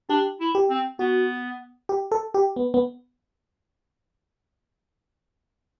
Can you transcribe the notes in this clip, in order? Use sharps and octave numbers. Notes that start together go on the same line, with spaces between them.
D4 G4
E4
G4
C4
B3 F#4
G4
A4
G4
B3
B3